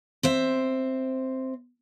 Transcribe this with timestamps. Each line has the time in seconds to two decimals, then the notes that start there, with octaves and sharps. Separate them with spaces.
0.23 C4 C5 E5